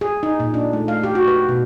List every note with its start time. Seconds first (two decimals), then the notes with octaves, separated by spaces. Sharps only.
0.01 G#4
0.23 D#4
0.40 A#2
0.54 D4
0.73 A3
0.88 F5
1.03 G4
1.15 F#4
1.28 B4
1.49 B2